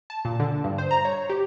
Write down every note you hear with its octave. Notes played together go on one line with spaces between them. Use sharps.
A5
A#2
D3
G2
C5
A#5
C#5
G4